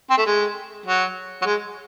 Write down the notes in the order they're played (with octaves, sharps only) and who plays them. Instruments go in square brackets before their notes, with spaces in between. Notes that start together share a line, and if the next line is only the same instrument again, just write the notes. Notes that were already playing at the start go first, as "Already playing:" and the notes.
[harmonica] C4
A3
G#3
F#3
F#3
G#3